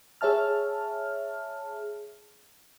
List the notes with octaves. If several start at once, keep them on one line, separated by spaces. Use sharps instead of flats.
G#4 C#5 E5 A5 F6